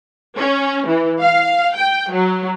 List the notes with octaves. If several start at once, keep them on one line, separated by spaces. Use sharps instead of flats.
C#4
E3
F5
G5
F#3